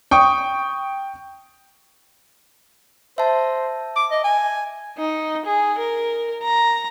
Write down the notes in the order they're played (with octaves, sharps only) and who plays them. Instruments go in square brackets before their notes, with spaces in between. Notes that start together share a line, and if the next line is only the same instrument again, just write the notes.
[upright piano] G5 C#6 D#6
[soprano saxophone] C5 [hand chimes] E5 A5
[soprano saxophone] D6
D#5
G#5
[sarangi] D#4
G#4
A#4
A#5